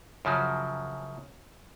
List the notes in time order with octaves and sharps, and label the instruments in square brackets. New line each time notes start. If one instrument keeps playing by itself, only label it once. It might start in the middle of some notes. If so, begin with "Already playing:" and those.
[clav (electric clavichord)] F#2 C#3 F3 F#3